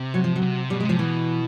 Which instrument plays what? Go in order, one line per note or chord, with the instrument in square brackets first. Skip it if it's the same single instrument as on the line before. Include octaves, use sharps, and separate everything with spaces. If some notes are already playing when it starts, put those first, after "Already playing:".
Already playing: [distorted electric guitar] C3
[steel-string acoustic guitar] F#3
F3
F#3
[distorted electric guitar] C3
[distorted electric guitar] B2 [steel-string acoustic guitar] G3
[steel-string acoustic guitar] G#3
[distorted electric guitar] C3 [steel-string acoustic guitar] F3
[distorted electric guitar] B2 [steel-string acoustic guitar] E3